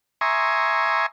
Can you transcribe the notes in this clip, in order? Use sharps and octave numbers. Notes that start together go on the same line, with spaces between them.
E5 G#5 A#5 C6 C#6 D#6